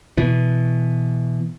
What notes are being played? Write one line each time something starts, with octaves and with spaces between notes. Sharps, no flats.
B2 E3